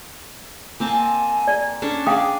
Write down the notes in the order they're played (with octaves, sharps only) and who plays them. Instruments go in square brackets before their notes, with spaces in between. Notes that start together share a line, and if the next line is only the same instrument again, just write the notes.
[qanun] A#3 C4 A5 [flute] G#5
[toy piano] D5
[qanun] C#4 D4 A4
[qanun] G#4 D5 [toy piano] F5 G5 D#6 [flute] D6